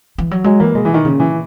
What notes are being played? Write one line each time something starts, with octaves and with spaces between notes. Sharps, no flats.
E3
F#3
F#3 G#3
E3 A#3
B2 G#3
E3
D#3
A#2 C#3
E3